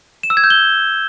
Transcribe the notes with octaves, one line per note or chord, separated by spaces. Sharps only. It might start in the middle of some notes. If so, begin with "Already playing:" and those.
E7
E6
G#6
G6
G7